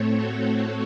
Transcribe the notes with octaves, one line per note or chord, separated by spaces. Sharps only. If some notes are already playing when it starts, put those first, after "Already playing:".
Already playing: A2 A3 C4 A4 C#5
F#4